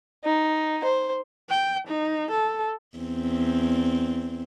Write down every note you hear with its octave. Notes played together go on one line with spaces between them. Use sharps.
D#4
C5
G5
D#4
A4
E2 C4